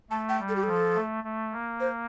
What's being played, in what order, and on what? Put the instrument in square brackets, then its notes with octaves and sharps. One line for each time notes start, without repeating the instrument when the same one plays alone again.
[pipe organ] A3 [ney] A5
[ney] G5
[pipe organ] G3
[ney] A4
G4
[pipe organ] F3 [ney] A4
[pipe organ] A3
A3
A#3
[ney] C5